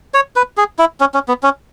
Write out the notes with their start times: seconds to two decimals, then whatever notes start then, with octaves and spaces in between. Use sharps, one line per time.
0.14 C#5
0.36 B4
0.57 G#4
0.79 E4
1.00 C#4
1.14 C#4
1.28 B3
1.43 C#4